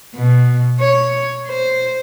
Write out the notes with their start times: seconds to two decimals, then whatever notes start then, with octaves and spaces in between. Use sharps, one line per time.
0.15 B2
0.80 C#5
1.48 C5